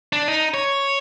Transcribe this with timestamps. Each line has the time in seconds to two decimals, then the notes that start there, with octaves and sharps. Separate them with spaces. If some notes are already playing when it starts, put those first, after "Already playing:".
0.13 D4
0.28 D#4
0.54 C#5